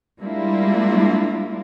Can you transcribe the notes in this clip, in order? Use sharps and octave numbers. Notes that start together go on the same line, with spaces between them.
G3 G#3 A#3 D4 E4 F4